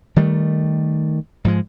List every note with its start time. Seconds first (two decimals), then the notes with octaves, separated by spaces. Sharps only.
0.16 D#3 G3 A3
1.45 G#2 F3 G#3